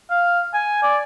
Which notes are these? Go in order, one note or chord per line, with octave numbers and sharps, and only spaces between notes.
F5
G#5
D5